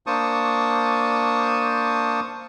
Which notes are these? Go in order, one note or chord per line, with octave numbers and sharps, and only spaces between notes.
A#3 D4 C5 A5 C#6 D#6